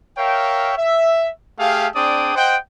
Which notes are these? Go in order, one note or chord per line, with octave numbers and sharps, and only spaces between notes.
A#4 C#5 E5 F5 G5
E5
A3 G4 G#4 F5
C4 D4 G#4 D5 G5 D#6
C5 D#5 F#5 G5